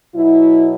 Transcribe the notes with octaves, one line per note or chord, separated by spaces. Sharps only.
B2 F#3 E4